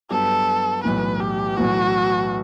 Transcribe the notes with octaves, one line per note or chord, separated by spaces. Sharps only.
G2 F#3 B3 F#4 A4
B1 A2 E3 B4
G4
B1 A2 E3 F#4